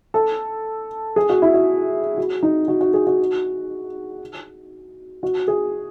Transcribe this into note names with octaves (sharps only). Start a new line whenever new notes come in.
A4
G#4
F#4
E4
F#4
F#4
D#4
F#4
F#4
G#4
F#4
F#4
G#4